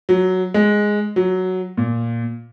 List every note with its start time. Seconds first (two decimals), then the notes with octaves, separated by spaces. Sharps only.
0.09 F#3
0.54 G#3
1.16 F#3
1.77 A#2